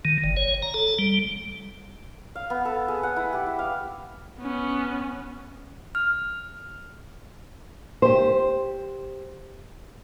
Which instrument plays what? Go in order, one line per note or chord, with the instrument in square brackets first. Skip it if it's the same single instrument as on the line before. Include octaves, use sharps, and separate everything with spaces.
[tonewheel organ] D#3
G1
C#5
A#5
A4
G3
[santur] F5
B3
A4
G#4
F#5
E4
G4
E4
F5
[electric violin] B3 C#4
[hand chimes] F6
[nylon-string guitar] G4 C5